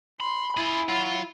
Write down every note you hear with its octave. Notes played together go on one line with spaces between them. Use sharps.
B5 C6
E4 F4 G#4
F#3 F4